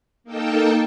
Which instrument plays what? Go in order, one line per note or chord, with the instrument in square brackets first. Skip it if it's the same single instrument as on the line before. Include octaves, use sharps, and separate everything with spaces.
[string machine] A#3 D#4 A4 A#4 G5 A5